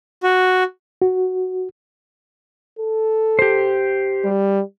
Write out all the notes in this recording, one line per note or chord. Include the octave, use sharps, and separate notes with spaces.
F#4
F#4
A4
G4 C5
G3